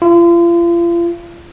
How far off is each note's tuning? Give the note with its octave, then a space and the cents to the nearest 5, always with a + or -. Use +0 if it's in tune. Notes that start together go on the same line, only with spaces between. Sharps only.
F4 -40